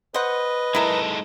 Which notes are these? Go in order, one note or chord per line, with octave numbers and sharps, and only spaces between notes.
B4 C5 D#5 F#5
G#3 D#4 E4 A4 A#4